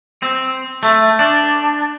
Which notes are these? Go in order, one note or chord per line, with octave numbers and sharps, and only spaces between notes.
C4
A3
D4